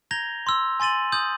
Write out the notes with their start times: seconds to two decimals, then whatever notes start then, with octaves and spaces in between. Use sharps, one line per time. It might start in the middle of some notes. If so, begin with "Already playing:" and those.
0.11 A#5 G6 G#6 A#6 F7 G7
0.47 C6 E6
0.80 G#5 C6 A6 D#7 F#7
1.12 D#6 G6 F#7